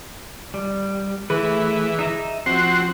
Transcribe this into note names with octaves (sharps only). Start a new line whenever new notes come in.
G3
E3 A3 G#4 B4
D#4 E5 A#5
F3 C4 F#4 C7